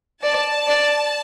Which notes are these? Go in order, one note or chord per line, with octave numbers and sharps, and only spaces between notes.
D5 A5
D5